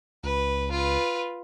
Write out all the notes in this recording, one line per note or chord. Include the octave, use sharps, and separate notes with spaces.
C#2 B4
F4 B4